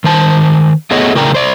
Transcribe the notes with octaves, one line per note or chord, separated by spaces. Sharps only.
D#3 C5 A5
A3 B3 G#4 C#5 D#5
A2 C#3 A#4 D5 G5 A#5
C5 D5